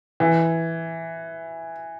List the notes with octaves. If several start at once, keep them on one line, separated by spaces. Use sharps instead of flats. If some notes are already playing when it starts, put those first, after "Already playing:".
E3